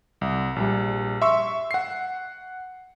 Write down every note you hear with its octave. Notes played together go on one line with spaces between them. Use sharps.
C2
A#1 G3
E5 C6 C#6 E6
F#5 C7